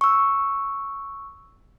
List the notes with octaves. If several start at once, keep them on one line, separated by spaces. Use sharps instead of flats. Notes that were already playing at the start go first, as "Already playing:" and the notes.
C#6 E6